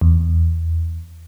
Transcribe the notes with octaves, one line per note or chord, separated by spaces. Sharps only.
E2